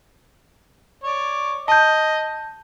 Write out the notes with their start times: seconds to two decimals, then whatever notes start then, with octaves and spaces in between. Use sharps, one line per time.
1.04 C#5 D5
1.68 D#5 A5 G6